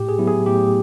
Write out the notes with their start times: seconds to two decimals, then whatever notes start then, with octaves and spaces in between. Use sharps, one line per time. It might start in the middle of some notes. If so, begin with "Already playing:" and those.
Already playing: A2 G4
0.09 G#4
0.18 F#3 B3 E4
0.28 G#4
0.46 A2 G4